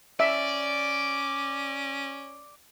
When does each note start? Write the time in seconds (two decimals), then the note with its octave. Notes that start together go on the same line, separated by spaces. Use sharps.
0.20 C#4 D5 E5